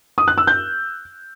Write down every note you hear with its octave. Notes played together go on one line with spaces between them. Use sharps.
D#6
F#6
E6
G6